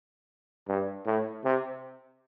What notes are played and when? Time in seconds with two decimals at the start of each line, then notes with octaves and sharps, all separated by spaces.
0.68 G2
1.06 A2
1.44 C3